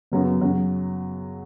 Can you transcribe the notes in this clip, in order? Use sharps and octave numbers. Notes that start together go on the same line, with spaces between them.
F#2 C#3 F#3 B3
F#2 C#3 F#3